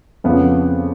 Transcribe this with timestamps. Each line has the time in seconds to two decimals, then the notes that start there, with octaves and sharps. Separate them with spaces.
0.24 F2 C#3 F3 B3